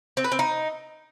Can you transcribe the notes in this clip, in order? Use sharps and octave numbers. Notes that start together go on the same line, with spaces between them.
C4
B4
C4
D#4